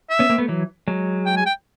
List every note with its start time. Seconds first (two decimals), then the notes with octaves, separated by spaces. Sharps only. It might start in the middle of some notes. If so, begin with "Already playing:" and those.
0.10 E5
0.19 B3 C#4
0.29 A#3 C4
0.38 A3 B3
0.48 E3 F#3
0.88 F#3 G#3
1.26 G5
1.37 G#5
1.46 G5